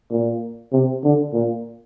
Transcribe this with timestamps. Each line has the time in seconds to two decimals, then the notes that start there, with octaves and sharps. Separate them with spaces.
0.11 A#2
0.73 C3
1.04 D3
1.33 A#2